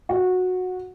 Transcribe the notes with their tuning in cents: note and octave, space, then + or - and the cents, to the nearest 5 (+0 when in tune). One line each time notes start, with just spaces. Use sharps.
F#4 -15